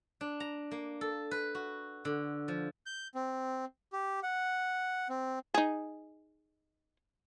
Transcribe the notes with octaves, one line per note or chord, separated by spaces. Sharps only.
D4
A#5
A#3
A4
B4
F#4
D3
F3
G6
C4
G4
F#5
C4
D#4 G#4